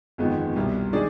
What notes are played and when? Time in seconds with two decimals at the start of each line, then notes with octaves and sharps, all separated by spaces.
0.18 G1 F2 D#3 G#3 B3
0.55 C2 B2 G3
0.93 D#3 G#3 D4 G#4 D5